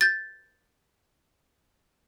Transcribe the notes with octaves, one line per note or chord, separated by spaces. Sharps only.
G6 A6